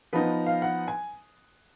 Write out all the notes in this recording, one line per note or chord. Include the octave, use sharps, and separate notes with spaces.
F3 B3 D#4 B4
F5
F#5
G#5